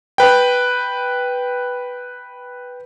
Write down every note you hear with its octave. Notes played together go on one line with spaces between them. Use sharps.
B4 G5